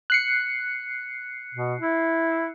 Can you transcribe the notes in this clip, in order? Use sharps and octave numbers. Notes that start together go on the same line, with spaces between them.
F#6 C7 C#7
B2
E4